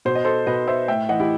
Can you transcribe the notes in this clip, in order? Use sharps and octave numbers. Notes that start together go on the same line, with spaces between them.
B2 C5
D#5
A4 C5
B2 B4 D#5
C5 E5
A2 E5 G5
E3 D#5 F#5
E4 G4